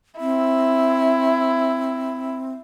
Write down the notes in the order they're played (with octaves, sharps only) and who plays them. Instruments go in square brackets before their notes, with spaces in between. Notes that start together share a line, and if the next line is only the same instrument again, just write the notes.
[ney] C4 [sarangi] E4